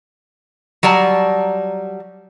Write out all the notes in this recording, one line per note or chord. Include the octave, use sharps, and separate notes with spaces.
F#3 G3 D5 A5 A#5